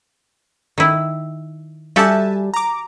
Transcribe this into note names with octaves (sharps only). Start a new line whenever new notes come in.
D#3 E4
G3 F#4 G4 A4 E5 G#5 A5
A#5 D6